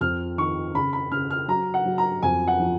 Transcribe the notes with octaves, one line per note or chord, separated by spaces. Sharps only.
F2 F6
D#3 C#6
C#3 B5
B5
C#3 F6
F6
F#3 A#5
F#5
F#3
A#5
F2 G#5
F#5
F3